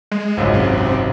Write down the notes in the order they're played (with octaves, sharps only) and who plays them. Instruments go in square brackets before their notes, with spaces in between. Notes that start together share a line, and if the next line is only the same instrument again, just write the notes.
[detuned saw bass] G#3
[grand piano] G#1 C#2 F#2
[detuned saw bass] C3